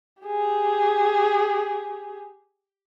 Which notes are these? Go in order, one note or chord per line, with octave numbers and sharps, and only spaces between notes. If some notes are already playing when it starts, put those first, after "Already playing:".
G4 G#4